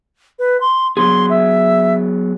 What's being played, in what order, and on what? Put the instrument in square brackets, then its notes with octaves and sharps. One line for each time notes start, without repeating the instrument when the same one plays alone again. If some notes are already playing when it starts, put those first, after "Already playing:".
[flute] B4
C6
[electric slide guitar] F#3 B3 G#4 [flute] C6
[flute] E5